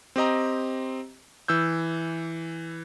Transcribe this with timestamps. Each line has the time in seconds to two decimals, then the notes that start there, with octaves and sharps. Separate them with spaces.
0.16 C4 G4 D#5 A#5
1.48 E3 E6 G6